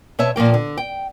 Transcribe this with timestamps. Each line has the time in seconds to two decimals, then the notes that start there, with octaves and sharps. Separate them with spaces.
0.19 B2 C#5 E5 A5
0.36 A#2 F3 A#3 G5
0.54 D3
0.77 G5